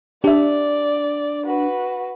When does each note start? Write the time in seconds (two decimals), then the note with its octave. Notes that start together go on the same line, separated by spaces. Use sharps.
0.24 D4 G4 D5 E5
1.46 F#4 B4